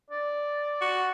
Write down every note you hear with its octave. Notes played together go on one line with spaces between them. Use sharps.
D5
F#4